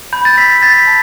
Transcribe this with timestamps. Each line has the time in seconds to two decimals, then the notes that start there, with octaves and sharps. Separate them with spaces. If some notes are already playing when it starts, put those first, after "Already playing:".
0.13 B5 G6
0.25 A6
0.38 E6 B6
0.50 A6
0.62 G6 A6
0.79 B6
0.87 A5